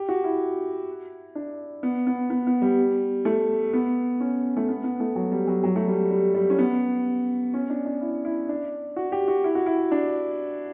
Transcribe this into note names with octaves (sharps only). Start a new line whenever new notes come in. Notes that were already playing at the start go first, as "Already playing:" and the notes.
Already playing: G4
F#4
E4
D4
B3
B3
B3
B3
G3
A3
B3
C#4
A3
B3
B3
A3
F#3
G3
F#3
F#3
A3
G3
G3
G3
C#4
B3
C#4
D4
D4
E4
E4
D4
F#4
G4
F#4
E4
F#4
E4
D4